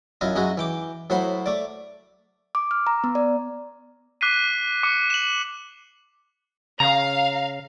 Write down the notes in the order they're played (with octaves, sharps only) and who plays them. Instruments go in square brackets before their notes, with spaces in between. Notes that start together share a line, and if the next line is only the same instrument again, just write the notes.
[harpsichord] F#2 E4 F4 D#5
F#2 G#3 D#4 E4 F#4
E3 G5 D6
A2 F#3 C5 F#5 B5 C6
A3 D5
[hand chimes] D6
F6
A#5
B3
D5
[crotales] D6 F#6 B6 C7 D#7
D6 C#7
E7 F#7
[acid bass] C#3 [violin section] F5 [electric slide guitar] A#5